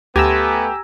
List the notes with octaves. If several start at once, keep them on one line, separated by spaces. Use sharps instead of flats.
D2 A3 B3 G4 G#5 A#5 E6